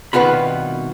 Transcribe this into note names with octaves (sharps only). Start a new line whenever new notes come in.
C2 B2 D#3 B3 F4 B5